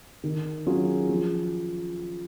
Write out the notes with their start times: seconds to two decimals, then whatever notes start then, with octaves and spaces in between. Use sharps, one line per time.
0.24 D#3
0.66 F#3 C#4 F4 G#4
1.09 F3